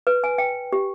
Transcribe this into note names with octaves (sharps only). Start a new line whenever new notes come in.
B4
G#5
G5
G4